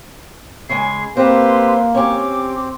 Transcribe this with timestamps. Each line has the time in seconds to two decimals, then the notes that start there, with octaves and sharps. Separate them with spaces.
0.69 C#3 G#3 G#5 C7
1.17 A#3 C4 G4 B4 C6
1.95 C4 C#4 G4 D6